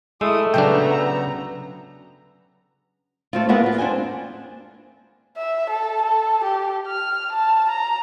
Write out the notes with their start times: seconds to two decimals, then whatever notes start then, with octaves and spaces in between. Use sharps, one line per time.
0.21 G#3 A3 E4 D#6
0.54 C#3 F#3 B3 D4 G5 A#5
3.33 A3 C4 F4
3.49 G#3 A#3 B3 E4 F4 F#5
3.63 B3 F4
3.78 C4 D4 G5 G#5
5.37 E5
5.70 A4
6.02 A4
6.44 G4
6.88 F6
7.32 A5
7.69 A#5